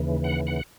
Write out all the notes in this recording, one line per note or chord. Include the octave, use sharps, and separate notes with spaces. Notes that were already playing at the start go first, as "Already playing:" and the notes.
Already playing: D#2 C#3 E3
F#5
F#5